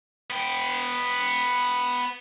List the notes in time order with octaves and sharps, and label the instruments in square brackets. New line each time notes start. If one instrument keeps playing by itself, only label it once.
[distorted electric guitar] B3 G5